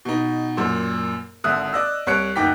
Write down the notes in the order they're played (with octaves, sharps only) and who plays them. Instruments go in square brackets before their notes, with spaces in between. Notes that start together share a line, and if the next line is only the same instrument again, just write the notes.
[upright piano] B2 D#4
F#2 A#2
G#1 D3 E5 D#6 F#6
D5 D#5 E6
C2 C#5 F#6 C#7 D7
F#1 D2 D#4 G5 D6 B6